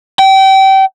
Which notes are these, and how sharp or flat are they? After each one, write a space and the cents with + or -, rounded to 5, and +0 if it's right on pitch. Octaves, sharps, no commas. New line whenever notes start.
G5 -30